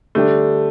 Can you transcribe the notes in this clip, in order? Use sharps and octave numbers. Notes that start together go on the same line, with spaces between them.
D3 G3 A3 D4 G4